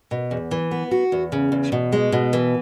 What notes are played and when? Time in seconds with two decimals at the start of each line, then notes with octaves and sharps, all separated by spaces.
0.11 B2
0.31 E2
0.51 E3
0.71 B3
0.91 F#4
1.12 E2
1.32 C#3
1.52 E2
1.72 B2
1.92 G#3
2.12 B2
2.33 E3